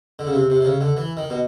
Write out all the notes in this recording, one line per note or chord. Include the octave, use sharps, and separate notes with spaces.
D3
C#3
C3
C3
C3
C#3
D3
E3
D#3
B2